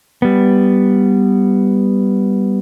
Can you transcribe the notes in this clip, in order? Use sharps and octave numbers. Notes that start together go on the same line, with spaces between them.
G3 B3